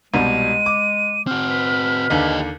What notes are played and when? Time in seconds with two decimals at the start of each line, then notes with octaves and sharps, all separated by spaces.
0.14 C2 B2 G3 G#3 D#7
0.66 D6
1.27 C4 F#4 F6
1.50 B4
2.10 D#2 D3 G4 D#5